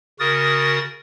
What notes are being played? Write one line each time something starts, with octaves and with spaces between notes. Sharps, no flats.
C#3 F#4 A#4 D#6 A6